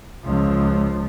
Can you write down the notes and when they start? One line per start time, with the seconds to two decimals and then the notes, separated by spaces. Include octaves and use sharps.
0.24 C#2 F3